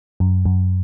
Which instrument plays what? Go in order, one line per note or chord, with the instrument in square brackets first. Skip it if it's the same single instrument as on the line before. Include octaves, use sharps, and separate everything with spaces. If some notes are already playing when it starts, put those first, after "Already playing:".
[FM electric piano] F#2
F#2